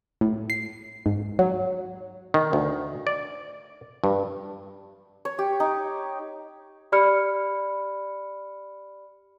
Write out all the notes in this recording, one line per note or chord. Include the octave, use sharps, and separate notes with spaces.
A2
C7
G#2
F#3
D#3
D2
D5
G2
C#5
G4
D#4
G4 D5 B5 F6 C#7